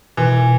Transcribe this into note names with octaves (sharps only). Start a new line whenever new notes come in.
B2 E3